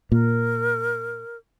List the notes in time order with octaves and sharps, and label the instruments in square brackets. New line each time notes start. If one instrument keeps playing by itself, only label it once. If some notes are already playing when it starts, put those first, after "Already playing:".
[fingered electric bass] A#2 [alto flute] A#4